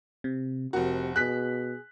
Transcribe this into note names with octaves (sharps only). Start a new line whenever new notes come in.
C3
F1 C3 F#4 A#4
B2 G#4 F#6 B6